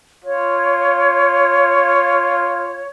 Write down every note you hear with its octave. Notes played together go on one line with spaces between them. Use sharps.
F4 C#5